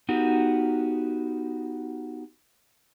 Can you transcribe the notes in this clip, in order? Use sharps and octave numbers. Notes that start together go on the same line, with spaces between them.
B3 D#4 F#4 G4 A#4